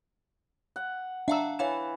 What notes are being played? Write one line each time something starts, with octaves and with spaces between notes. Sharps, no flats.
F#5
D4 E5 F5 A#5 E6
E3 C#5 F5 E7